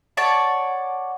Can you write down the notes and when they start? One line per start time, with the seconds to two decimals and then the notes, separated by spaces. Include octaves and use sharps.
0.17 C#5 D5 F#5 A5